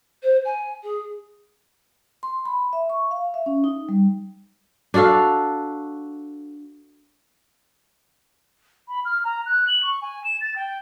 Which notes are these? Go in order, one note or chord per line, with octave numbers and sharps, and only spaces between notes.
C5
G#5
G#4
C6
B5
E5
C#6
F5
E5
C#4
D#4
G3
D4 F#4 A4 F5
B5
F6
A#5
F#6
F#7
C#6
G#5
E7
A6
G5